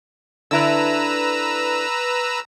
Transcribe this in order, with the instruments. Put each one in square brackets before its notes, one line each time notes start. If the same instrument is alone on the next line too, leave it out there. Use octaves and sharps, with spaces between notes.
[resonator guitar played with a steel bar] D3 D4 E4 [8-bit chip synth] B4 A#5 E6